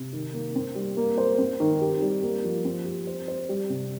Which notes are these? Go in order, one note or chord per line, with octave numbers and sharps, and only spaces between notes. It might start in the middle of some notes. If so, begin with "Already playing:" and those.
Already playing: C3
D#3
A#3
C4
G3
A#3
C5
C4
D#3
G4
G3
A#3
F3
C4
G4
C5
C5
G3
C3